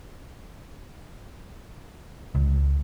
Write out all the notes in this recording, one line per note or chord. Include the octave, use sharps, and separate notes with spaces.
C#2